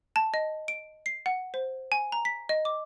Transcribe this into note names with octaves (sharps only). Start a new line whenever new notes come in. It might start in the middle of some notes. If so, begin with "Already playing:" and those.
A5
D#5
D7
C7
F#5
C5
G#5
A#5
B6
D#5
D6